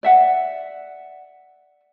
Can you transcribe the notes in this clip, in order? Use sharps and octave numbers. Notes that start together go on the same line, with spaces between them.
D5 E5 F#5